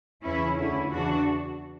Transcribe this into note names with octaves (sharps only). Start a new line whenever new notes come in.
E2 C#3 E3 C#4 E4
D2 D3 C#4 E4
E2 C#3 E3 D4 F#4